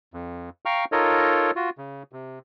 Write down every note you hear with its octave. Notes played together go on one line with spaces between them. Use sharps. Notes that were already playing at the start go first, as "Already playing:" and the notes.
F2
F5 G5 A#5 C#6 F6
D#4 F4 A4 A#4 C#5 D#5
F4 F#4
C#3
C3